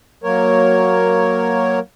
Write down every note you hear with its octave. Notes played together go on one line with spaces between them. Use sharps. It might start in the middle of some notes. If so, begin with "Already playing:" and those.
F#3 A#3 A#4 C#5